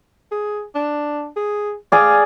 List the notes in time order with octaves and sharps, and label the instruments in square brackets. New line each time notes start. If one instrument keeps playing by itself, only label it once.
[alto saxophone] G#4
D4
G#4
[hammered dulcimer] G#4 D5 [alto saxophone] F5